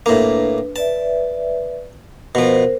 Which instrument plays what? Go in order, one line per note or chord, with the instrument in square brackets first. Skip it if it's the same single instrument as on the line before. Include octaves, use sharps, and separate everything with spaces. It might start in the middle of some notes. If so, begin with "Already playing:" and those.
[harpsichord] A2 A#3 [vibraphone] D4 B4
[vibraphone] B4 D5 E5 [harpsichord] A5
[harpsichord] B2 F3 [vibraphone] A#4 C5